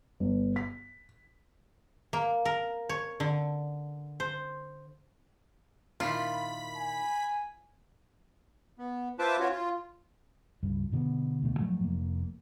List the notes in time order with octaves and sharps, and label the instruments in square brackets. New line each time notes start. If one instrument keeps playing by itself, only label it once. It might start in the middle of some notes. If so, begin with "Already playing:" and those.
[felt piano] G1
B6
[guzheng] A#3
A#4
C#5
D3
C5
[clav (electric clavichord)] A#2 D#3 E4 [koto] F4 [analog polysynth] B5 B6
[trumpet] G#5
[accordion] B3
F4 B4 C5 E5 A5 D6
C#4 F4 F#4 C#5
F4
[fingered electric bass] C#2 G2
B2 D3 B3
D2 B2 A3
G#2 F3 F#3 A3
F1 A#3